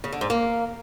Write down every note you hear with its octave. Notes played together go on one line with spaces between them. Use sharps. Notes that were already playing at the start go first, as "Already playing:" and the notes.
C#3
D3
G#2
A#3